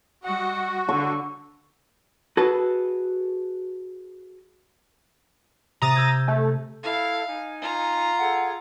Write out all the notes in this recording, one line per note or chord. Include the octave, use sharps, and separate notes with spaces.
G3 F#4 D#5 F#5
D3 C#6
F#4 G#4 A4 B4
C3 A#5 D#6 A6
E6 G6 G#6
A3
E4 A4 F5
D#4 G#5
F4 A#5
G#4 A4 F#5